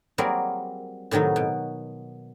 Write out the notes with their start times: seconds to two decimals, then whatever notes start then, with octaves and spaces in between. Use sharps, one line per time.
0.18 F#3 G3 A#3 C4 G#4 A#4
1.11 A2 C3 D#3 F#3 D#4
1.36 B2